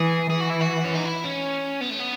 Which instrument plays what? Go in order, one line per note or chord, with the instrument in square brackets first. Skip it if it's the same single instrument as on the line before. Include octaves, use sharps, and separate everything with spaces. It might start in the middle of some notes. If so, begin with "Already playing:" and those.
Already playing: [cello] E3 [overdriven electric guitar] G#4
[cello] E3 [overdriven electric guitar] G#4
[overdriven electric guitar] F#4
E4
F#4
C#4
D#4
E4
C#4
B3
A3
B3